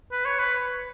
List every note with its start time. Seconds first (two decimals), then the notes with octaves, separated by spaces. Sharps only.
0.12 B4
0.25 C#5
0.39 B4